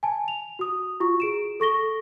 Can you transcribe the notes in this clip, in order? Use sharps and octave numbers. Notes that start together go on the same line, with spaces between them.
G#5 A5
F7
F#4 D#6
F4 F#4 C#6
G#4 D7 E7
A4 C#6 A#6 G7